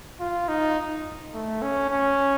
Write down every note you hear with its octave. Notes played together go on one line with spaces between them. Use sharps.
F4
D#4
A3
C#4
C#4